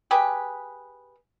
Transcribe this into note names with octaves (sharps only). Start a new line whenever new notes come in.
G4 G#4 B4